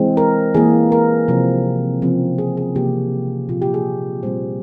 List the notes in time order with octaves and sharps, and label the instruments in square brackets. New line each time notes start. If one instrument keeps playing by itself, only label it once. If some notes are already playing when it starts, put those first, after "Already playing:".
Already playing: [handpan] E3 G#3 C4
A#4
E3 A#3 G#4
A#4
C3 F3 C4
C#3 F3 C4
G#4
G#4
C3 E3 A#3 G4
A#2 F3 C4 F4
G4
G#4
A#2 G3 C4 C5